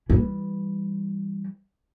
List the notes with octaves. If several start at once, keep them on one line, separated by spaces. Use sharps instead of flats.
E3 G3